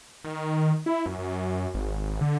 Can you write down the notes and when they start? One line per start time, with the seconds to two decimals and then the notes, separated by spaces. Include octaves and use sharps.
0.25 D#3
0.86 E4
1.06 F#2
1.18 F#2
1.74 G#1
2.21 D3